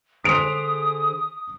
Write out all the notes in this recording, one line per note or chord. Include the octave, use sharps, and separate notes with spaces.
D3 G#4 C5 D#6 B6 D7 F7